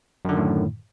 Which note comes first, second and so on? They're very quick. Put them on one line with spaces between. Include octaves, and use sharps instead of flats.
F#2 D3 D#3 A2